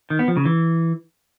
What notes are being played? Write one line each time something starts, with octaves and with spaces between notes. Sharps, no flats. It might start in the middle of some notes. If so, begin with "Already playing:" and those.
D#3
B3
F3
C#3
E3